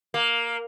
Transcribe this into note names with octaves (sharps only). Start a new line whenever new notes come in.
A#3